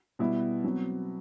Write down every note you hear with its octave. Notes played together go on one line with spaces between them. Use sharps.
B2 G3 B3 E4
B2 F#3 C4